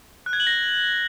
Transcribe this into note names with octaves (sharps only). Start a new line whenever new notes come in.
F#6
G#6
F#7
A#6